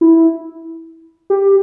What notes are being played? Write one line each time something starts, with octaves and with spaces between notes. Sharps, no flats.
E4
G4